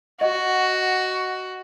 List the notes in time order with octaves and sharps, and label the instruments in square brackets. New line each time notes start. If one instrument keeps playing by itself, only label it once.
[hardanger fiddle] F#4 [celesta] D#5 F#5